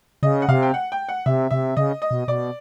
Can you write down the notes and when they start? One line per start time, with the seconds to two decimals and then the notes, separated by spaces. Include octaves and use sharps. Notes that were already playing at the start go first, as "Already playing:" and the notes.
0.23 C#3 D#5
0.42 F#5
0.48 C3 F5
0.63 G5
0.74 F#5
0.92 G5
1.09 F#5
1.26 C3 E5
1.51 C3 E5
1.77 C#3 D#5
2.02 D#5
2.11 B2
2.28 B2 D5